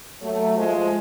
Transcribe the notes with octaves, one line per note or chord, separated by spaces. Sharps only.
F#3 A3
F3 G#3